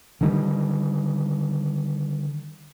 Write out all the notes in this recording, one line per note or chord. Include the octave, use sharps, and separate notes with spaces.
D3 D#3 G3